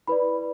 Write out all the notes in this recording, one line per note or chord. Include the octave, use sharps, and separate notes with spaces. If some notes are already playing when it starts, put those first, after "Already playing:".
E4 B4 D5 B5